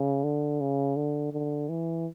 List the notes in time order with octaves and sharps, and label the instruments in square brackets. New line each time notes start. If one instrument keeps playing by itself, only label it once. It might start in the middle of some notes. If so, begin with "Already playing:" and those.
Already playing: [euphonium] C#3
D3
C#3
D3
D3
E3